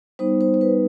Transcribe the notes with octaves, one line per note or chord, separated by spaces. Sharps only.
G3 B3 D#4 C5
C5
C5
B4